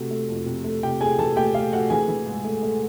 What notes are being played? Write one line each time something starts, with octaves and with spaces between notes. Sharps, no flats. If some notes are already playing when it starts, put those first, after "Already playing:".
Already playing: C3 A3 F#4
A3
F2
C3
A3
C3 G4 G5
A3 G#4 G#5
E3 A4 A5
A3 G4 G5
A3 F5
A3 F#4 F#5
E3 G#4 G#5
E3
G#2
A3
A3